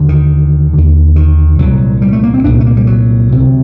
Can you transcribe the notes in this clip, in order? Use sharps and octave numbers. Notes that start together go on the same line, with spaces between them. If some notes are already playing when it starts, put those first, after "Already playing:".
Already playing: D#2 D3
D#3
D#2 D3
D#3
C2 A#2 F#3
G3
A3
A#3
C4
C2 A#2 D4
C4
A3
A#3
G3
F#3
D2 C3